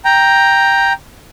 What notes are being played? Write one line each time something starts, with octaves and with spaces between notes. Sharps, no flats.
G5 A#5